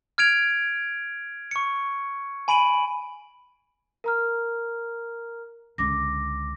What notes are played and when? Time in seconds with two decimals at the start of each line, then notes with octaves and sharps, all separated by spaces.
0.18 F6 G#6 D7 F7
1.51 C#6 C#7
2.48 G#5 B5 D7 D#7 F#7
4.04 A#4 A#5 F6
5.78 C#2 D3 D6 A#6